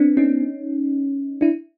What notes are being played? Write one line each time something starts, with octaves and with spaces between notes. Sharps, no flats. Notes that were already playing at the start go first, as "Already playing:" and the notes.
Already playing: B3 C4 D4
C#4 D#4
D4 E4